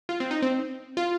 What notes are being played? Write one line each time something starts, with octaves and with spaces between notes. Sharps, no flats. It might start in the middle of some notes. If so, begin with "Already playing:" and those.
F4
C4
D#4
C4
F4